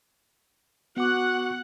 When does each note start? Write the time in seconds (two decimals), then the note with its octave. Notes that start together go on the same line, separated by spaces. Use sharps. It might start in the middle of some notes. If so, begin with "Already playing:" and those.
0.97 B3 F#4 F#5 D6 F#6